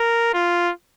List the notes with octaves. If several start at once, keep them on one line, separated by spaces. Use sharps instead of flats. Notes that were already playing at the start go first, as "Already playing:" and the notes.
Already playing: A#4
F4